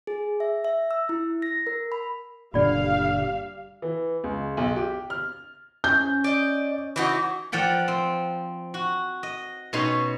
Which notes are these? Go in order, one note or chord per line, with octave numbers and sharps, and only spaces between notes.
G#4
E5
E5
E6
E4
A#6
A#4
B5
F#1 A#2 D3 G3 F4 D5 F5
E3
C#2
B1
G4
F6
C#4 G6
D5 D#5
E3 D#4 F#4
F3 D5 F#5 G5 B5
C4
F#4
D#5
B2 C#4 D#4 C#5 C6